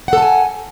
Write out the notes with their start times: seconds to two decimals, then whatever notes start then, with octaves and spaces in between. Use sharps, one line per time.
0.08 F#5
0.13 A4
0.18 A5
0.22 G#5